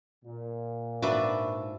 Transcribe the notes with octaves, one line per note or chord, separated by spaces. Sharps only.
A#2
G#2 D4 F#4 B4 E5 D6